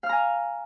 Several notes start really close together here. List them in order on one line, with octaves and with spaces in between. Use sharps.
F5 F6 A#5 G#5